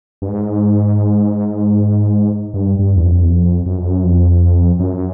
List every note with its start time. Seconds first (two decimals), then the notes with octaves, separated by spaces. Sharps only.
0.22 G2
0.28 G#2
2.54 G2
2.79 G2
2.96 E2
3.04 F2
3.24 E2
3.29 F2
3.66 F#2
3.78 F2
3.89 F#2
4.04 F2
4.80 F#2